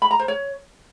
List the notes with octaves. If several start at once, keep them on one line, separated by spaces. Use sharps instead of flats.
B5
A#5
C5
C#5